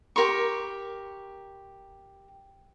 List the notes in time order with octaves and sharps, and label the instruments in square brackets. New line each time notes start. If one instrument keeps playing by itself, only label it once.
[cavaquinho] G4 A#4 C6 C#6